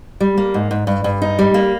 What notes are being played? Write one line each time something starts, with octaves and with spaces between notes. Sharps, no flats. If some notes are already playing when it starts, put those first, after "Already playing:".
G3
A#3
G#2
G#2
G2
G2
D#4
G3
A#3